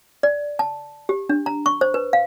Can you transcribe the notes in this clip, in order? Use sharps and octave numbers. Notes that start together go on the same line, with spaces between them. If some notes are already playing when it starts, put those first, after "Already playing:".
D5
A5
G4
D4
A#5
C#6
C5
B4
F5